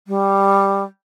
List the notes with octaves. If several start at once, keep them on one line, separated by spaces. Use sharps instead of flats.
G3